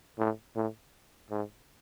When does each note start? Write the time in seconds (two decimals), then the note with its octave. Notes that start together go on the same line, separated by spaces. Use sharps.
0.19 A2
0.56 A2
1.31 G#2